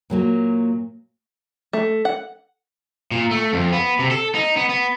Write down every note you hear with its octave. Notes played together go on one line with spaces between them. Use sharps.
A#2 F#3 A#3
A3
F#5
A#2
A3
F2
B3
C3
A4
D#4
B3
B3